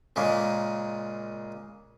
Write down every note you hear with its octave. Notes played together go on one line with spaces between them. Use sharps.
A#2 C#3 G#3 A#3